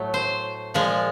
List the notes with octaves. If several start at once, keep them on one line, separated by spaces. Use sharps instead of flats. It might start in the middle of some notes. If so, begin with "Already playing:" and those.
Already playing: A2 F#3 A3
C5
A#2 F3 G#3